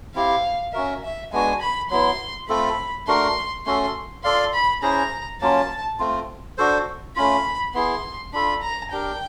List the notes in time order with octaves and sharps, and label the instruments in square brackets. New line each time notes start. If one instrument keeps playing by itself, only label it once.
[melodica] C4 E4 G4 [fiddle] F5
[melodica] C#4 F#4 A#4 [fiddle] E5
[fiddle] E5
[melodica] G#3 B3 D4 F#4 [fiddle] G#5
[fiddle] B5
[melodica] F#3 B3 E4 [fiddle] C6
[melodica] A3 C4 F4 A4 [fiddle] B5
[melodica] A3 D4 F#4 A#4 [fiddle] C6
[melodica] A3 C#4 F#4 A4 [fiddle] C6
[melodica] F4 A4 D5 F5 [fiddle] C6
[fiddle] B5
[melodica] C#4 E4 G#4 C5 [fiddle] A#5
[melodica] F#3 A#3 C#4 F4 [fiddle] A5
[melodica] A3 C4 F4
D4 F#4 A4 C5
[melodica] A3 C#4 F4 [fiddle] B5
[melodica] B3 E4 G#4 [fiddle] C6
[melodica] D4 F4 A4 [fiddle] B5
[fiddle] A#5
[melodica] D4 G4 A#4 [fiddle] G5